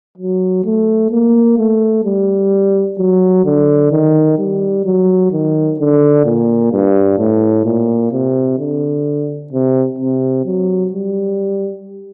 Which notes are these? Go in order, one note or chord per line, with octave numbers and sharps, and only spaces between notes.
F#3
A3
A#3
A3
G3
F#3
D3
D#3
G3
F#3
D#3
D3
A#2
G2
A2
A#2
C3
D3
C3
C3
F#3
G3